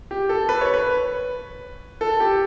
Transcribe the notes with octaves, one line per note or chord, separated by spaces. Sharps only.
G4
A4
B4
C#5
B4
A4
G4